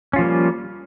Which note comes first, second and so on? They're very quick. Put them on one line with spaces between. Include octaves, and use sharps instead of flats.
C#4 F4 F3 A#3 G3